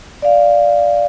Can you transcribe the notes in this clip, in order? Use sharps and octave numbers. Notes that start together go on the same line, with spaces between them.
D5 F5